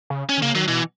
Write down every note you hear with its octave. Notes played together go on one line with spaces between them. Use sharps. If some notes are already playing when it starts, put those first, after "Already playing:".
C#3
C#4
D#3
C#3 A#3
D#3 F#3
B2 E3